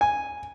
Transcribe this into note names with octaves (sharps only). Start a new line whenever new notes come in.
G#5